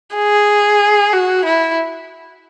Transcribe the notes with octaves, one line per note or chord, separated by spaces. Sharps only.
G#4
F#4
E4